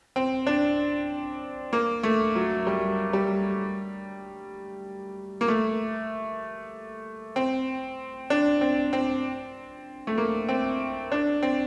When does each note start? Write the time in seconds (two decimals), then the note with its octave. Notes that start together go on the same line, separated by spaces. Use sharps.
0.16 C4
0.47 D4
1.73 A#3
2.03 A3
2.35 F#3
2.67 G3
3.13 G3
5.41 A#3
5.48 A3
7.36 C4
8.30 D4
8.61 C4
8.93 C4
10.07 A3
10.18 A#3
10.49 C4
11.12 D4
11.43 C4